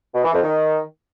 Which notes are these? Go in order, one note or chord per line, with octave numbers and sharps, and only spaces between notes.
B2
E3
F2
D#3